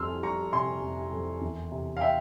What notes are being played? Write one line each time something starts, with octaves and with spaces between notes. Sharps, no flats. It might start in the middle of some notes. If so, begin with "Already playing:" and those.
Already playing: F1 F2 G3 C6 E6 F6
G3 A#5 C#6
C3 G#5 C6
F1
F2
E1
C3
F5
E5 G5